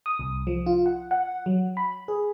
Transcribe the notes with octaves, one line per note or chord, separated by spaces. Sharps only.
D#6
C2
F3
F4
F#5
F#5
F#3
B5
G#4